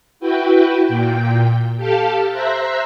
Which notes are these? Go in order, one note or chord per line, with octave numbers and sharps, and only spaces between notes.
E4 F#4 B4 G5
A#2 G5
G4 A4 F5 A5
C5 E5 A#5 E6 F#6